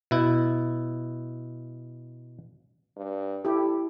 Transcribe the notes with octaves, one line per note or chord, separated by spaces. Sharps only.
B2 E4
G2
E4 G4 A4